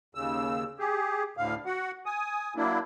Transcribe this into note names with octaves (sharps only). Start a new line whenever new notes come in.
D#2 C#3 E6
G4 G#4
D2 A2 D3 F5
F#4 F#5
G#5 D#6
F#3 A#3 D4 E4